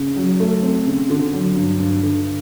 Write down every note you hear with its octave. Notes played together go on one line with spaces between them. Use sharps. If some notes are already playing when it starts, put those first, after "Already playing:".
Already playing: C#3
F#3
A3
C4
C#3
D3
F#3
G2
G2
D3